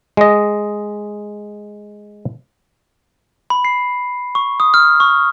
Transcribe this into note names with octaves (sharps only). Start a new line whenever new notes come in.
G#3 D#5
B5
C7
C#6
D#6
F6
C#6